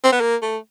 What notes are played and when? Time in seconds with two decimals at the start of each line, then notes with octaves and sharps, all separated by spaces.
0.04 C4
0.12 B3
0.21 A#3
0.42 A3